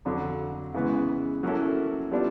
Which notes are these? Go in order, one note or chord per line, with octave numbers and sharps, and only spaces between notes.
F2 D3 F#3
C#3 E3 G#3 B3
F#3 A#3 C#4 E4 A4
G3 B3 D4 F4